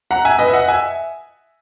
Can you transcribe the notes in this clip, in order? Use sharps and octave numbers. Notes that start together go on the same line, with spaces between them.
F#5 A#5
E5 G#5
B4 D#5
E5
D#5 F#5
E5 G#5